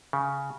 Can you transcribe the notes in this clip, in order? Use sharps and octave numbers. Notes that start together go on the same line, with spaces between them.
C#3